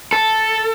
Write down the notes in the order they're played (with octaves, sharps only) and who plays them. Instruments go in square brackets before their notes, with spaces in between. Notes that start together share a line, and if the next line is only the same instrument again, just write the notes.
[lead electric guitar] A4